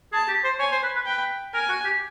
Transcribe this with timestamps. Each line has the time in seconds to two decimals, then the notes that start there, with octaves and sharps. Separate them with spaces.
0.13 G#4 A5
0.28 G4
0.44 C5
0.59 C#5 G#5
0.72 C5
0.83 B4
0.95 B4
1.06 B4 G5
1.54 A#4 G#5
1.69 F#4
1.85 G4